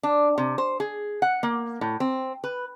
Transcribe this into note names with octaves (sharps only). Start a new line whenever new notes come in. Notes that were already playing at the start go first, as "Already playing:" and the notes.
D4
C3
C5
G#4
F#5
A#3
A2
C4
B4